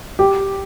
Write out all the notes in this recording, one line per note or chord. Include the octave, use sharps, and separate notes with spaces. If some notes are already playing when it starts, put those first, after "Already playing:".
G4